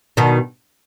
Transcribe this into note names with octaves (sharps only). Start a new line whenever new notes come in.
B2 D#3